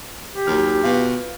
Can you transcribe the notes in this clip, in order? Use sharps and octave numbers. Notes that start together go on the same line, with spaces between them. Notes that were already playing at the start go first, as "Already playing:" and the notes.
G4
D#2 F#3 F6
B2 F4 B4